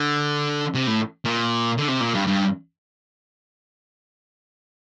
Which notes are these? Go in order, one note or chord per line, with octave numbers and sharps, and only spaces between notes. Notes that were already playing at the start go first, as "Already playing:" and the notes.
Already playing: D3
C3
A2
A#2
D3
C3
A#2
G2
G2